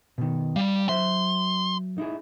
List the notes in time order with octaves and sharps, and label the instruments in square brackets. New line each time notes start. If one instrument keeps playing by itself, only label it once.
[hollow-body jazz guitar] B2 D#3
[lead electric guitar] G3 [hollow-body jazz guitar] F5
[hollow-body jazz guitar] F#3 C5 E5 [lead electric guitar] C6
[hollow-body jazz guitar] D#4 E4 G#4